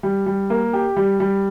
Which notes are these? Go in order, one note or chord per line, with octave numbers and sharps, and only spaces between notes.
G3
G3
A#3
G4
G3
G3